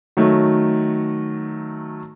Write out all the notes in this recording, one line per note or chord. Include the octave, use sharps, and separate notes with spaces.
D#3 F#3 A3